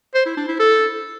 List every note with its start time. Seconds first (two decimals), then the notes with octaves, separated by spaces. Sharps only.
0.15 C5
0.26 E4
0.37 D4
0.48 E4
0.59 A4